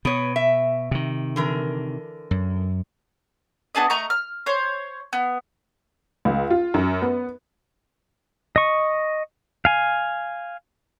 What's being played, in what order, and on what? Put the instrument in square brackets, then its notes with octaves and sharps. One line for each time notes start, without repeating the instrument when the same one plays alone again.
[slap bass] B2 [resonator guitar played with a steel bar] B3 C#5
[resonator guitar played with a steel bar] E5
[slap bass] C3 D#3
[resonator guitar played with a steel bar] D3 E3 A#4
[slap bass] F#2
[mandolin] B3 D4 G#4 D#5
A3 D#5 A#5 C#6
F6
C5 C#5
B3
[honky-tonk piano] C#2
F4
F#2
B3
[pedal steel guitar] D#5 C#6
F5 G#5